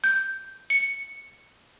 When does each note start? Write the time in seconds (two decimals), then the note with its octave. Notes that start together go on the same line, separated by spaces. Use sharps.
0.04 G6
0.70 C#7